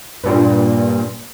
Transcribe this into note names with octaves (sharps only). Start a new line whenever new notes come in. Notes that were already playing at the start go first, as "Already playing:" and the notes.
G2 A#2